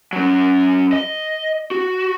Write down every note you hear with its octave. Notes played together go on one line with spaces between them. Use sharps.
F#3 C#4
D#5
F#4